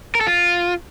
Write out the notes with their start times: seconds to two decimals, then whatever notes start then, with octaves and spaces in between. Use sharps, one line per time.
0.15 A#4
0.21 A4
0.27 F4